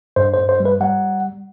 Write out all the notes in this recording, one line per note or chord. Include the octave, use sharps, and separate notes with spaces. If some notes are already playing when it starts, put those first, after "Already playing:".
G2 C5
C5
G2
C5
G3
B4
G3 F#5